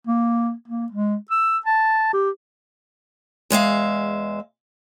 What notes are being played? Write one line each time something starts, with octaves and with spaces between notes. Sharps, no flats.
A#3
A#3
G#3
E6
A5
G4
E2 G#3 E5 F5